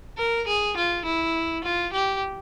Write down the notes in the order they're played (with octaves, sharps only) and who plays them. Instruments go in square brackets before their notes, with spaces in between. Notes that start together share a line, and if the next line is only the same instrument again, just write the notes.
[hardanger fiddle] A#4
G#4
F4
E4
F4
G4